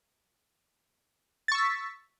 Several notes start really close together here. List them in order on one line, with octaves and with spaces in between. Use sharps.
A6 C#6 E6 B6